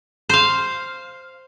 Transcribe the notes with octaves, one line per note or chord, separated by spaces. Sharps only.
C5 F5